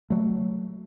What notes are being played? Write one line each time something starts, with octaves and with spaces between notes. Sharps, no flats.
F#3 A3